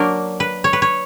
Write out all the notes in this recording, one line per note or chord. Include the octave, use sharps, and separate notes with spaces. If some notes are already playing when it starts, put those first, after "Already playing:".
Already playing: F#3 A#3 D4 A#4
B4
C#5
B4
C#5